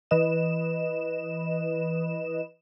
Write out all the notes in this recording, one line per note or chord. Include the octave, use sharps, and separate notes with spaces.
E3 B4 D#5 E7